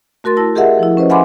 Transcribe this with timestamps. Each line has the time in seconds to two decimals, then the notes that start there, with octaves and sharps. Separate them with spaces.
0.24 A3 F#4 A#4 C6 A6
0.37 E4 A5 E6 A#6
0.55 G4 G#4 A#4 D#5 E5 F#5
0.79 F3 E4
0.97 C#4 B4 C5 D#5
1.09 E5 F#5 G#5 B5 C6 D6